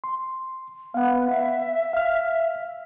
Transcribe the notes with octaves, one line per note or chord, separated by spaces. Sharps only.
C6
B3 F5 F#5
E5
F5 F6